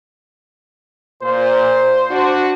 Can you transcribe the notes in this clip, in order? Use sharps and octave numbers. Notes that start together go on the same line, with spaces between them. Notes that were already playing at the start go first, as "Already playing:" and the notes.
A#2 C5
D4 F#4